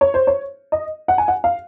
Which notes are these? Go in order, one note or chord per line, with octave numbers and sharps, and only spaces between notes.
C#5
C5
C#5
D#5
F#5
G#5
F#5
F5